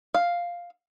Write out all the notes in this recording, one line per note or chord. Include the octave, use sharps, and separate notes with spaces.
F5